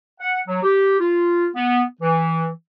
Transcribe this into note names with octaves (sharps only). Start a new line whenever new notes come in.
F#5
F#3
G4
F4
B3
E3